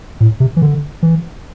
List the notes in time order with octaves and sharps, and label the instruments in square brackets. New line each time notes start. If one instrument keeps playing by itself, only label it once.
[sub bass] A2
C3
E3
D3
E3